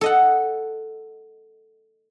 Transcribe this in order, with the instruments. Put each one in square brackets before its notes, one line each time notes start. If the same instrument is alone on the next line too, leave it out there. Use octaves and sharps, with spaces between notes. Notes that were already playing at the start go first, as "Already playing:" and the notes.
[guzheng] A4 D#5 F#5